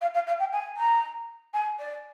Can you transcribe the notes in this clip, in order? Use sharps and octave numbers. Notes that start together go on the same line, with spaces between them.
F5
F5
F5
G5
G#5
A#5
G#5
D5